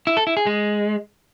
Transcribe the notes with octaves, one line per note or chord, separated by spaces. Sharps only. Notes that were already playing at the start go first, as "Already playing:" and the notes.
E4
A4
E4
G#4
G#3